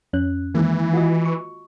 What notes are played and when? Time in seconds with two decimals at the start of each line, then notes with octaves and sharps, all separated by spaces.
0.13 F2 C#4 F#6
0.54 D#3 E3 G#3 A#3
0.93 F4 F#4 D#5
1.25 C#6